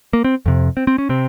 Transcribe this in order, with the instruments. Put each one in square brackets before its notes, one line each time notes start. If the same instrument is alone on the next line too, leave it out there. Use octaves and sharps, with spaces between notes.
[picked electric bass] A#3
C4
F2 C3
C4
C4
C#4
C3 C4